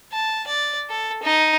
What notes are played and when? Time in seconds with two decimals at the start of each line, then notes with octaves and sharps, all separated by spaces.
0.12 A5
0.47 D5
0.90 A4
1.23 D#4